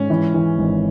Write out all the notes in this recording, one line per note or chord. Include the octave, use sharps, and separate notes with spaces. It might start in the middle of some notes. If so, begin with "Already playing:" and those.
Already playing: G#2 C#4
E3
E3
G#1